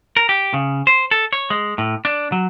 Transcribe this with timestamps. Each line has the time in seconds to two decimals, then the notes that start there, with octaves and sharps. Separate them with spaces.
0.17 A#4
0.29 G4
0.54 C#3
0.87 C5
1.11 A4
1.33 C#5
1.50 G#3
1.78 A2
2.05 D4
2.32 F#3